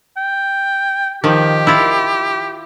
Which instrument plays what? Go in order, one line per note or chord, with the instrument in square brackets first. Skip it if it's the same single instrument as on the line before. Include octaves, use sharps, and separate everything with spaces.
[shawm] G5
[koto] D#3 F3 [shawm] G4
[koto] E4 F4